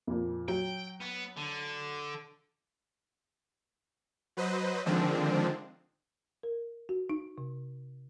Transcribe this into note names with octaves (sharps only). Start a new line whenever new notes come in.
F2 A#2
F#3 G5
B3
D3
F#3 B4 C5 D#5
D3 D#3 F3 G#3 C4 D4
A#4
F#4
D#4
C3